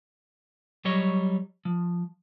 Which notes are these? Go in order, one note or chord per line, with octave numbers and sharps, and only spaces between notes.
F#3 G3 C#5 D#5
F3